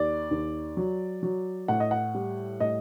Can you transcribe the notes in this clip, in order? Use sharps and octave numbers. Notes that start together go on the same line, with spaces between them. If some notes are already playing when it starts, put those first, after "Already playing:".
Already playing: D#2 D5
D#2
F#3
F#3
A2 F#5
D#5
F#5
G3
A2 D#5